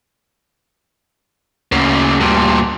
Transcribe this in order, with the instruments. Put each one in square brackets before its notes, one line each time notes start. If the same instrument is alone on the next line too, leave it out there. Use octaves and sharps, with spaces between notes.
[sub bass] D2 [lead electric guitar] C#3 A#3
[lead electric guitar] G2 A#2